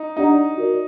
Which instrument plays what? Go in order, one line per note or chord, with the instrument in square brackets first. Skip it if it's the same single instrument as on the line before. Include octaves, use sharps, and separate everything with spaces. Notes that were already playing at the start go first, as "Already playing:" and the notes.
Already playing: [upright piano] D#4
[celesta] D4 G4 D5 F#5 A#5 [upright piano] D#4
[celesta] F#4 A#4 D5